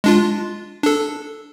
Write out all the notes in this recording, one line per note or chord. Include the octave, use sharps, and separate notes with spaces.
G#3 D4 F4
D4 A4